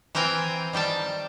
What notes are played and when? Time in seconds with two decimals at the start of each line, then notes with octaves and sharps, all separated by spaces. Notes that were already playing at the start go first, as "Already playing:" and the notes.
0.15 E3 C4 A#4 G5 G#5
0.73 D#3 G3 G5 A5